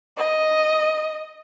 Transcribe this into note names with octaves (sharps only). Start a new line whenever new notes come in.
D#5